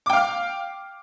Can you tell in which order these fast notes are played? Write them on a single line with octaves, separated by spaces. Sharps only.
D6 G5 F5 F6